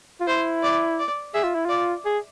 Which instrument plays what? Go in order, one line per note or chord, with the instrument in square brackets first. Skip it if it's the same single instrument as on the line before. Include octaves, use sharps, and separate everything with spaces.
[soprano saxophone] F4
[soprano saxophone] E4 [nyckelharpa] C5
[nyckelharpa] D5
D5
[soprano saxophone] G#4 [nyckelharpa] E5
[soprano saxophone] F4
E4
[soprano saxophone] F4 [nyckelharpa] D5
[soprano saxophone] G#4